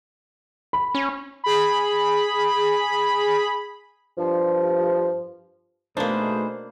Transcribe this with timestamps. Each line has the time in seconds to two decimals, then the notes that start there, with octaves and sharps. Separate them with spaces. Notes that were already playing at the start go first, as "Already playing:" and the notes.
0.73 B5
0.95 C#4
1.44 G#4 B5
4.18 G2 F3
5.97 B2 A3 A#3 D4 D#4 G#4 B4 C5